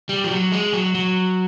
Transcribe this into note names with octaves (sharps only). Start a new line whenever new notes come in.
G3
F3
F#3
G#3
F#3
F#3